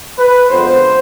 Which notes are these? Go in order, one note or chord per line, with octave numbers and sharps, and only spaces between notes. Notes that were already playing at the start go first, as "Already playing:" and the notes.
B4
F2 D3 G#3 B3 C5